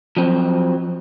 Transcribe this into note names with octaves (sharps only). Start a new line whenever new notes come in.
F3 F#3 C4